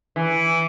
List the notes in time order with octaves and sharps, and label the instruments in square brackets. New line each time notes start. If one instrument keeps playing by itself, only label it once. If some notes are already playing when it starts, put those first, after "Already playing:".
[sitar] E3